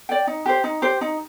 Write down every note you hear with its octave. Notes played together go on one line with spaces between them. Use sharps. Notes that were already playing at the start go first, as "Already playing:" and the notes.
D5 G5
D#4
G4 C5
D#4
G4 C5
D#4